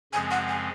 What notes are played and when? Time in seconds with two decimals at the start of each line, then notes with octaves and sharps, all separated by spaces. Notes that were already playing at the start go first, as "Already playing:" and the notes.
0.13 F#2 C#3 F3 G#3 C4 G#5
0.31 F#5
0.49 G#5